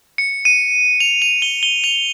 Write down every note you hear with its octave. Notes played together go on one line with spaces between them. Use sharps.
C#7
D#7
F7
F7
G7
G7
F7